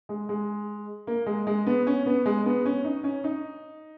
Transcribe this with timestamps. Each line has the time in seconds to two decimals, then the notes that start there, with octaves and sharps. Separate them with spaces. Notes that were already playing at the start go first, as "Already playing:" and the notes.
0.09 G#3
0.29 G#3
1.07 A#3
1.26 G#3
1.47 G#3
1.66 B3
1.87 C#4
2.06 B3
2.26 G#3
2.46 B3
2.65 C#4
2.84 D#4
3.04 C#4
3.24 D#4